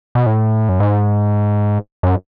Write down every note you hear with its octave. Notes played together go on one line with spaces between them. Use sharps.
B2
A2
F#2
G#2
F#2